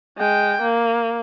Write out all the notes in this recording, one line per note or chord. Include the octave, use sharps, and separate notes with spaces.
G#3 G5
A#3